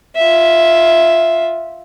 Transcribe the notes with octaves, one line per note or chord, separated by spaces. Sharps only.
F4 E5